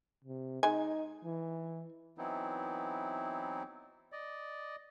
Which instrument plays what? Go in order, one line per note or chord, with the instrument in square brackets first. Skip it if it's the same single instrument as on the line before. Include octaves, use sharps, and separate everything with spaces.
[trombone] C3
[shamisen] G#3 G#5 [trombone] D#4
[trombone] E3
[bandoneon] E3 F#3 B3 C4 D#4 E4
D5 D#5